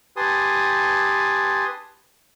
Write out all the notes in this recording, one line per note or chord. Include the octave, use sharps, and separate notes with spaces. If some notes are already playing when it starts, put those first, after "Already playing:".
G4 B4 G#5 A5 C6 D#6